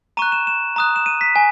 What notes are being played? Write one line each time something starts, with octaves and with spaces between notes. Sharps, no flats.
A#5 C#6 F#6 D#7
E7
E7
A#5 D#6 F#6
E7
D#7
B6
G#5